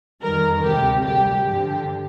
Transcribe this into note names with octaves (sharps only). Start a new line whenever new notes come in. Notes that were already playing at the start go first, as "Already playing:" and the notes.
F2 D#3 G3 A#4
D2 C3 G3 G4
D2 C3 G3 G4
G2 D3 F3 G4